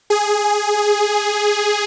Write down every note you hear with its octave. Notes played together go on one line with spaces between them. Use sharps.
G#4